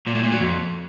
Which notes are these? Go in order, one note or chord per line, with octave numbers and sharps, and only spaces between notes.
A#2
A2
A#2
F#3
F2